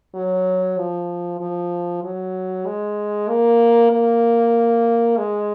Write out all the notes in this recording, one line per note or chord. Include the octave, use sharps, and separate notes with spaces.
F#3
F3
F3
F#3
G#3
A#3
A#3
G#3